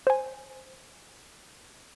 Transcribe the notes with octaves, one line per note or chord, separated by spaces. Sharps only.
C5 G#5